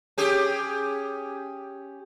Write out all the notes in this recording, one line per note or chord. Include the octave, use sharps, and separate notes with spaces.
C#4 G4 G#4